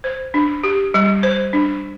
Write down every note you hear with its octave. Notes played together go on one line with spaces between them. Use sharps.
C5
D4
G4
G3
C5
D4